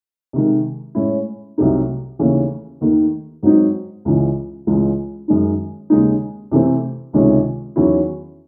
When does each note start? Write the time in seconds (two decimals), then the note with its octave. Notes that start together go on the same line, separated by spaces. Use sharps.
0.33 C3 D#3 G#3
0.95 A2 G#3 C#4 E4
1.58 C2 C3 F#3 A3 D#4
2.19 D#2 C#3 E3 A3 C#4
2.81 D#2 D#3 A3
3.43 G#2 F#3 C4 D#4
4.05 C#2 C#3 E3
4.67 C#2 C#3 E3 G#3
5.28 F#2 D#3 G#3 D#4
5.90 D#2 C#3 G#3 D#4
6.52 C3 E3 A3 C4
7.13 C#2 C3 D#3 G#3 C#4
7.76 E2 D#3 F#3 C#4 E4